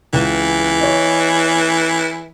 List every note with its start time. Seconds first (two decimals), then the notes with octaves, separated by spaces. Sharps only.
0.13 C#2 E3
0.81 C#5 D#5